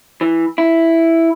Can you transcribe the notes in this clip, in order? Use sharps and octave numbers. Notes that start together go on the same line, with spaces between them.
E3
E4